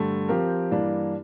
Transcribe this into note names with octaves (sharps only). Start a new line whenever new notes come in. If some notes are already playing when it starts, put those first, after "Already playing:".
Already playing: G2 D3 A3
F3 C4 G4 A#4
G2 E3 A#3 D4